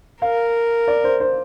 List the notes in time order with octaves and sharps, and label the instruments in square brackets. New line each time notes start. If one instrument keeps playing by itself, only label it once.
[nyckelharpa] A#4 [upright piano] F5
[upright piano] D5
C5
C5